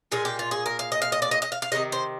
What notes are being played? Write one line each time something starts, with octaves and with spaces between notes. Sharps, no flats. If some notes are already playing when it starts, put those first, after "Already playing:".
A#2 G#3 G#4
G4
F4
G#4
A#4
F5
D#5
F5
D#5
D5
D#5
D#5
F5
F5
C3 D#3 G#3 D#5
C5